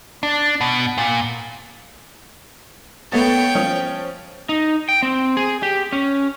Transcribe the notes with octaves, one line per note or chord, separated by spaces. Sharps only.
D4
B2
A#2
A3 B3 C#5 G5 A6
F3 C#4 F4
D#4
G5
C4
G#4
G4
C#4